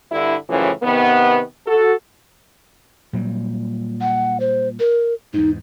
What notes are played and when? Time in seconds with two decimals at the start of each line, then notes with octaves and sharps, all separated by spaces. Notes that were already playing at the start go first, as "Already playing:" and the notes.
0.11 G2 D3 E4
0.49 F#2 A2 C#3 E3 F3
0.82 C3 D#3 B3
1.67 F#4 A4
3.13 A#2 F#3 G3
4.01 F#5
4.40 C5
4.80 A#4
5.34 E2 G#2 D#4